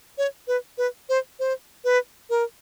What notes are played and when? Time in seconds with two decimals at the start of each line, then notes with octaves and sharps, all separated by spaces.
0.18 C#5
0.47 B4
0.78 B4
1.09 C5
1.39 C5
1.84 B4
2.30 A#4